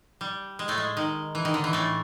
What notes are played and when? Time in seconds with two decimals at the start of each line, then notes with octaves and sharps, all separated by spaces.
0.21 G3
0.59 G#3
0.68 A2 A3
0.78 G#3
0.97 D#3
1.35 E3
1.45 D#3
1.54 D3
1.64 E3
1.73 A2 A3